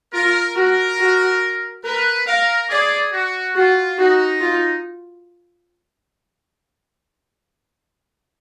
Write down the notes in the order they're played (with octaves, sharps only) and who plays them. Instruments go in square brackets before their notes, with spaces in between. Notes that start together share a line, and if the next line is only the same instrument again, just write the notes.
[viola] F4 [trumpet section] A#4
[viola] F#4 [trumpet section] A#4
[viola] F#4
[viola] A#4 [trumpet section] B4
[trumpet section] A#4 [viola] F5
[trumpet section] G#4 [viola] D5
[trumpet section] F#4
[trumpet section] F4 [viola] F#4
[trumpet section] D#4 [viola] F#4
[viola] F4